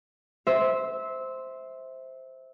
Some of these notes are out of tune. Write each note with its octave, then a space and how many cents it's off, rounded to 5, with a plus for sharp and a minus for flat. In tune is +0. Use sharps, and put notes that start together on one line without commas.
C5 +0 E5 -20